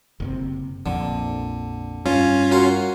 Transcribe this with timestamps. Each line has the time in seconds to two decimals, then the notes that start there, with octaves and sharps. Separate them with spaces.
0.20 F#1 A2 C3
0.86 A#1 F2 A#2 D3
2.06 G2 C#4 F4
2.52 F#4 A#4 C6